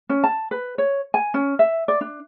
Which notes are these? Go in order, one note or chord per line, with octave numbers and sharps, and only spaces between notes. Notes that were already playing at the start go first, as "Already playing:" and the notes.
C#4
A5
B4
C#5
G#5
C#4
E5
D5
D4